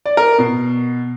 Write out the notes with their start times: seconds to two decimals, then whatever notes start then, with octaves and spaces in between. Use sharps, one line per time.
0.06 D5
0.17 A#4
0.38 B2